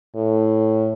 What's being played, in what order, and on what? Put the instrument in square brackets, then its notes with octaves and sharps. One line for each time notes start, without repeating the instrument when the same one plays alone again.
[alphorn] A2